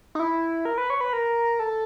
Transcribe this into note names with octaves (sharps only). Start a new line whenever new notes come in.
D#4
E4
A#4
B4
C#5
B4
A#4
A4